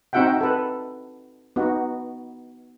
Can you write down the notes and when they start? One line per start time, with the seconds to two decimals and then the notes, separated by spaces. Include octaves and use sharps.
0.13 C4 D#4 F#4 E5 F#5 G5
0.41 A4 B4
1.56 B3 D#4 F#4